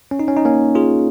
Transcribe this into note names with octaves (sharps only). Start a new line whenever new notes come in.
C#4
D#4
C#4
D#4
A#3 C#4
F4 G#4